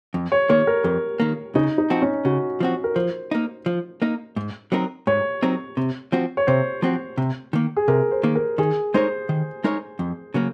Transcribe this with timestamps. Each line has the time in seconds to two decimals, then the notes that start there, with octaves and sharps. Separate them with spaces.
0.14 F2
0.32 C#5
0.49 D#3 A#3 C#5
0.67 A#4
0.84 F2 A#4
1.20 D#3 A#3
1.55 C#3 D#4
1.78 D#4
1.90 F3 C4 F#4
2.02 C#4
2.25 C#3 F#4
2.60 F3 C4 F#4
2.84 A#4
2.95 F3 C5
3.31 A#3 D#4
3.66 F3
4.02 A#3 D#4
4.36 G#2
4.72 F#3 C4 D#4 A#4
5.07 G#2 C#5
5.43 F#3 C4 D#4 A#4
5.77 C3
6.12 F3 C4 F#4
6.37 C#5
6.47 C3 C5
6.82 F3 C4 F#4
7.18 C3
7.53 D#3 A#3
7.77 G#4
7.88 C3 A#4
8.11 C5
8.23 D#3 A#3
8.35 A#4
8.58 D#3 G#4
8.94 G#3 D#4 A#4 C5 C#5
9.29 D#3
9.64 G#3 D#4 A#4 C#5
9.99 F2
10.34 C#3 F#3 A#3